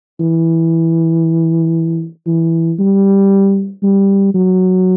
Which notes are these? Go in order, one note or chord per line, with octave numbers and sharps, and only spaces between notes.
E3
E3
G3
G3
F#3